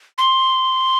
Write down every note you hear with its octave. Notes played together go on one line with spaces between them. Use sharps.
C6